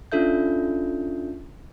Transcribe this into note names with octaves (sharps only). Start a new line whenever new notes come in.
C#4 D4 F4 A4 E5 G6